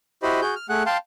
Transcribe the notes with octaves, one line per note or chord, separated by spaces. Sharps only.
E4 F#4 G4 C5 D#5 B5
F#4 G#4 G6
F6
A3 G#4 F#5 F#6
F5 G5 A5 C6